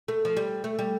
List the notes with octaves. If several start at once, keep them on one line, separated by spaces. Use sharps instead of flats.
A3
F3
G3
A3
G3